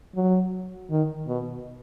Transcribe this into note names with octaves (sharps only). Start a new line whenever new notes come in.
F#3
D#3
B2